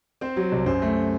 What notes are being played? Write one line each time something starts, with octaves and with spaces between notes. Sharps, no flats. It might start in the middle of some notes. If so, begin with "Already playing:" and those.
C4 C5
F#3
C2
F#2 C5
A3